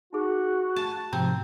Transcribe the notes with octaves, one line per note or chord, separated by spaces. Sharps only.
D#4 F#4 G#4
A5
G#2 C3 F3 C4 A#5